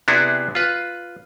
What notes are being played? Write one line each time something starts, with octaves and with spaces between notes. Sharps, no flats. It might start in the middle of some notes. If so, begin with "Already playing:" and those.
C3 B3 D4 E4 F#4 G#4
F4 B4